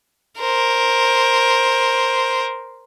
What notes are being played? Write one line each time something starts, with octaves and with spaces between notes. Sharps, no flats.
A#4 C5